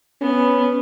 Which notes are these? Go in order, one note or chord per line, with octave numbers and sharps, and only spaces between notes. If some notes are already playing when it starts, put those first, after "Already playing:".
B3 C#4